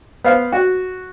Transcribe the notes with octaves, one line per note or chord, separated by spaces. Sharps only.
B3 C5 F5
F#4